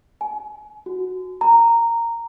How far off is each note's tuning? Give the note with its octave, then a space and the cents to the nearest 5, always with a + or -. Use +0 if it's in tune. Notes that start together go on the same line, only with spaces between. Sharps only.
G#5 +35
F#4 -5
A#5 -10